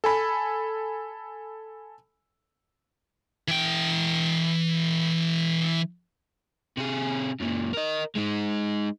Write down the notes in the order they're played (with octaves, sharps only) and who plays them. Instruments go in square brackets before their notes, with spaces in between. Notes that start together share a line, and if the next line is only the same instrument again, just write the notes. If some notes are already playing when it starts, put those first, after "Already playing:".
[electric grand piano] A4 G#5 B5
[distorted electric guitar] E3 G5
[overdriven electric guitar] C3 G#4
F#2 A#2
A#4 D#5
G#3 D#4